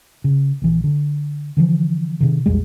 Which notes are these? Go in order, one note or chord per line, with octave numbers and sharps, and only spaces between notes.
C#3
A#1 E3
D3
D3 E3 F3
C3 D#3
A#1 E2 G3 G#3